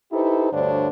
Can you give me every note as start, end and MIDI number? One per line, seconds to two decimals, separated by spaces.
0.13 0.48 63
0.13 0.48 64
0.13 0.48 67
0.13 0.48 69
0.13 0.48 71
0.13 0.48 72
0.52 0.88 38
0.52 0.88 43
0.52 0.88 50
0.52 0.88 62
0.52 0.88 72
0.52 0.88 73